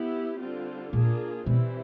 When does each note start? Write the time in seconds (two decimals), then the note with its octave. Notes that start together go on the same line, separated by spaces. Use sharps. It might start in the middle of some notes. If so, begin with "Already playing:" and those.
Already playing: B3 E4 G4
0.39 D3 G3 C4 F4
0.93 A#2 A#3 D4 F4 G#4
1.46 B2 E3 G3 C4 E4